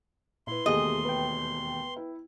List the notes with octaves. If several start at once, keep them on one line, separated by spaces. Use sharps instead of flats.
A#2 E4 B4 C6
E1 D#2 A3 G4 G#4 D#5 D#6
B4 G5
E4